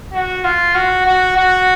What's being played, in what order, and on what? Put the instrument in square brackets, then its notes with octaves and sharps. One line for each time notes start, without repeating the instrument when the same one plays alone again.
[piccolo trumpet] F#4
F4
F#4
F#4
F#4